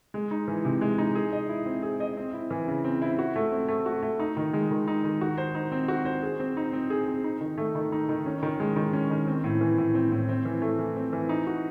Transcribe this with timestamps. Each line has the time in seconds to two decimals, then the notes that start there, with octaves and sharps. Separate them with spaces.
0.14 G#3
0.31 D#4
0.48 E3
0.65 C3
0.81 G#3
0.98 D#4
1.15 G#4
1.33 D#5
1.49 E4
1.66 C4
1.82 G#4
2.00 D#5
2.17 C4
2.33 E4
2.50 E3
2.67 C#3
2.84 C4
3.02 E4
3.19 F#4
3.36 A3
3.52 C4
3.68 A3
3.86 F#4
4.03 A3
4.19 D#4
4.37 D#3
4.53 G#3
4.71 D#3
4.87 D#4
5.04 D#3
5.21 F#4
5.38 C5
5.55 D#4
5.72 C4
5.88 F#4
6.05 C5
6.23 G#4
6.40 C4
6.57 D#4
6.73 C4
6.90 G#4
7.08 C4
7.24 D#4
7.41 D#3
7.58 A3
7.75 D#3
7.92 D#4
8.09 D#3
8.26 C#4
8.43 D#3
8.60 G#3
8.76 D#3
8.93 C#4
9.10 D#3
9.27 C4
9.44 A2
9.61 E3
9.78 A2
9.94 C4
10.12 A2
10.29 C4
10.45 E3
10.62 A3
10.79 E3
10.96 C4
11.13 E3
11.29 D#4
11.47 F#4